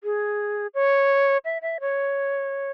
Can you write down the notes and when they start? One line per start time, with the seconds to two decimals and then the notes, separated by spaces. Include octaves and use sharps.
0.04 G#4
0.74 C#5
1.45 E5
1.62 E5
1.81 C#5